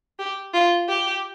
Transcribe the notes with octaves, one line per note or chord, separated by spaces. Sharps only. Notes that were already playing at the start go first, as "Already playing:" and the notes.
G4
F4
G4